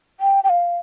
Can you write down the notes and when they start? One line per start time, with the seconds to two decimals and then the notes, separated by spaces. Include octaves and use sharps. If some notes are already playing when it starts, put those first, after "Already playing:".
0.20 G5
0.44 G5
0.49 F5